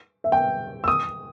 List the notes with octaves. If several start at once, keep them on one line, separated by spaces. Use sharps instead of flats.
E5
G5
E6
D#6